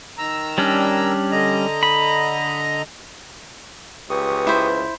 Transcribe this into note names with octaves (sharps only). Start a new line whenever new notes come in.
D#3 A#5 E6
G3 C#4 D4
D3 D#5 A#5
B5
C#2 G4 B4 C#6 D#6
E4 C5